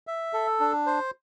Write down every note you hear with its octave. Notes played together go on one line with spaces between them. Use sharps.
E5
A4
D4
C5